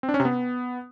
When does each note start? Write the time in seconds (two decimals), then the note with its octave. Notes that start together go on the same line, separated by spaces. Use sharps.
0.03 C4
0.09 D4
0.14 C#4
0.20 C3
0.25 B3